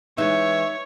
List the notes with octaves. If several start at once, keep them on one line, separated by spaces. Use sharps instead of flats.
E3 G#3 D#4 C#5 E5